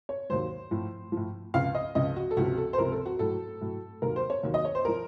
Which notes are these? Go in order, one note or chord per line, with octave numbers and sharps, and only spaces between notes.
C#5
D#2 D#3 F#3 C5
A2 F3
A2 F3
C#2 C#3 F3 F5
D#5
C#2 C#3 F3 D#5
F#4
A4
C#2 C3 F3 F#4
A4
C5
C#2 C3 F3 A#4
A4
F#4
A2 F#3 A4
A2 F#3
D#2 D#3 F#3 A#4
C5
C#5
D#2 D#3 F#3
D#5
C#5
C5
F3 A#4